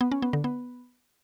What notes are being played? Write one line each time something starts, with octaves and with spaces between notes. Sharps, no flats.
B3
C#4
B3
D3
B3